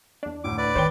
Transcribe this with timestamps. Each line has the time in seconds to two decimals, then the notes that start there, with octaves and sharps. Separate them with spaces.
0.23 E2 D4
0.44 D2 A2 D6
0.58 B4 D5 D6
0.75 D#3 B3 C5 C#5 G5 G7